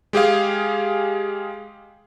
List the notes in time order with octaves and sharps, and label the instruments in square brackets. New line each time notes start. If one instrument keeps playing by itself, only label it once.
[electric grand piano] G#3 G4 G#4 F5